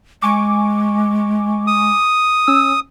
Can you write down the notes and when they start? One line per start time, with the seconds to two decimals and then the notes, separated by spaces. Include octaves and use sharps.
0.22 G#3 G#5 C#6 D6
1.67 D#6
2.47 C#4 E6